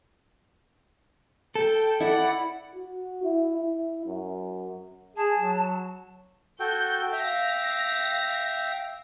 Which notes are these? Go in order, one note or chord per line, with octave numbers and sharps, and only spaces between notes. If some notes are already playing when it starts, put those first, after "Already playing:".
A4 G5
E4 D5 F#5
F#4
E4
E4
F#2
G#4 A5
F#3
F#4 A4 G5 G6
E5 F5 G5 A#6